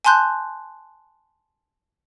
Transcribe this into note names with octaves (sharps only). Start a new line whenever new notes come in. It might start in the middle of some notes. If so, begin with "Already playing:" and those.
G#5 A5 C6 F#6 G6